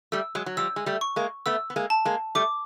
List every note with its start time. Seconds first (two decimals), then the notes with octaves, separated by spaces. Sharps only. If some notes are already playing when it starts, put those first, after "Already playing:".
0.12 G3 A3 E6
0.35 F#3 G#3
0.46 F#3
0.57 F3 G3 E6
0.76 G#3
0.86 G3 A3
1.01 C#6
1.16 G#3 A#3
1.46 A3 B3 E6
1.70 B3
1.76 G#3 A#3
1.90 A5
2.05 G#3 A#3
2.35 G3 A3 D6